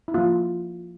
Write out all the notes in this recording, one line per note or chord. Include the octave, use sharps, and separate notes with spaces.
E4
F3 A#3 F4